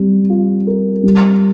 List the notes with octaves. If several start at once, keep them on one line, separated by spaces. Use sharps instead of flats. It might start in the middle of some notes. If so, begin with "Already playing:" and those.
Already playing: G3 C4
F4
A#4
G3